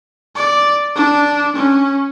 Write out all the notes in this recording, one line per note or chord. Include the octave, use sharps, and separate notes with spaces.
D5
D4
C#4